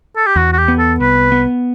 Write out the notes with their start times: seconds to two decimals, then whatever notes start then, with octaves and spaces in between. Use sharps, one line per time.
0.16 A4
0.26 G4
0.36 E2 F#4
0.53 F#4
0.58 G4
0.68 B3
0.78 A4
1.00 C2 B4
1.32 B3